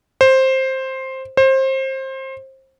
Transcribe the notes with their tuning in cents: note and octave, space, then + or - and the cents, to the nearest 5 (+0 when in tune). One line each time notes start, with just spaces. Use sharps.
C5 +10
C5 +25